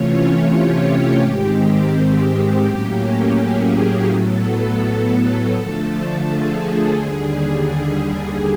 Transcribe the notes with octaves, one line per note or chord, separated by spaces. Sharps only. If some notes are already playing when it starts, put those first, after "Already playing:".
Already playing: C3 E3 A3 C#4 F4 C#5
G4
G#2 D#3 G#3 C4
G4
A2 F#3 A#3 C#4
G#4
A2 F#3 B3 A4
D3 F3 A3 A4
G#4
D#2 D3 G3
G#4